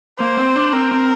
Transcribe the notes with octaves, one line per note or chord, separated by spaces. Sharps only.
A#3 C5
C4
D4
C4 A#4
C4